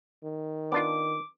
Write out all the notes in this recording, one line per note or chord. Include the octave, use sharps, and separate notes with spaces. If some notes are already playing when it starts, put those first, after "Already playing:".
D#3
B3 D4 F4 D6